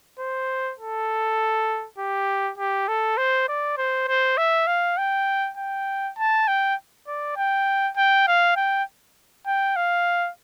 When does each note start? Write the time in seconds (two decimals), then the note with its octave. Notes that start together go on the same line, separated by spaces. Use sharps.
0.19 C5
0.79 A4
1.99 G4
2.58 G4
2.88 A4
3.18 C5
3.48 D5
3.78 C5
4.08 C5
4.37 E5
4.67 F5
4.98 G5
5.58 G5
6.18 A5
6.48 G5
7.08 D5
7.37 G5
7.97 G5
8.27 F5
8.56 G5
9.47 G5
9.76 F5